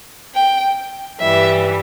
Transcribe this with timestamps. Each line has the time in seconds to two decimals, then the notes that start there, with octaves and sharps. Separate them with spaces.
0.34 G5
1.19 G2 E3 G3 E5